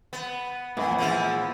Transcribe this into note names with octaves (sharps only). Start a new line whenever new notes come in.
B3
F2 A#2 E3 B3
F3 G#3 E4